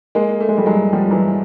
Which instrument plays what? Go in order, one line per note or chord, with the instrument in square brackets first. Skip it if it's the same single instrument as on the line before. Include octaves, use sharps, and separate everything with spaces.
[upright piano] G#3 A#3
A3
G#3
G3 A3
F#3 G#3
F3 G3
E3 F#3